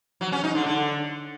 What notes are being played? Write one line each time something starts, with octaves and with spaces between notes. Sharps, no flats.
F#3
C#4
D#4
D3
D3